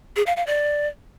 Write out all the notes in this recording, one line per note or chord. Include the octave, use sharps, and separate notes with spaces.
G#4
F5
F5
D5